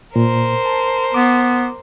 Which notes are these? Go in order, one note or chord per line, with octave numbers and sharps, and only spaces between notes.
A#2 A#4 C5
A5
B3 D6